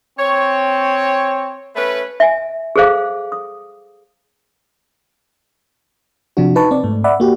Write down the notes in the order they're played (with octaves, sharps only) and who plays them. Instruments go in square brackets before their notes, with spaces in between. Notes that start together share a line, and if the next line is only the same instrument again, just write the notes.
[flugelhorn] C4 [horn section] C#5
[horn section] A3 C#4 B4
[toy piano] E5 G#5
G#4 A4 C5 F5 D6
D#6
[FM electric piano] C3 F3 D4 F#4
D#4 B4 A5 C#6
C4 D5
G#2 A3
D5 E5 F#5 B5
A#3 F#4 G4